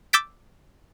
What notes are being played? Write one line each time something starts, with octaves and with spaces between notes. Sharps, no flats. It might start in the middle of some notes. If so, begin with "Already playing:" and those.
D6 E6 G6 A6 B6 D7